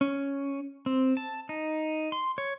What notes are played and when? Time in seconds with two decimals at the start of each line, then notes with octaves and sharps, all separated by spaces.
0.01 C#4
0.86 C4
1.17 A5
1.49 D#4
2.12 C6
2.38 C#5